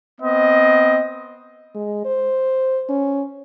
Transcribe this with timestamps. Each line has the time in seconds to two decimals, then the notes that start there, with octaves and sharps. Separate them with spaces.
0.20 B3 C4 D#5
1.75 G#3
2.05 C5
2.89 C#4